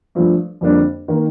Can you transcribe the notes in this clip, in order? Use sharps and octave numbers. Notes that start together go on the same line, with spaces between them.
G2 F3 A3
F2 D3 G3 A#3 D4
D#3 A#3